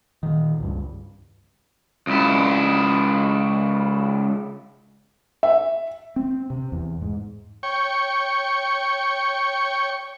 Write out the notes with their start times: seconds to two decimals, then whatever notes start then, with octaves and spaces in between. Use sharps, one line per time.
0.23 A#2 D#3
0.60 C#2 G2
2.07 C#2 E4
5.43 E5
6.16 C4
6.50 C3
6.72 E2
7.02 G#2
7.63 C#5 G5 C#6